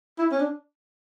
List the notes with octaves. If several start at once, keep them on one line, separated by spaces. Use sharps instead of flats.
E4
C#4
D4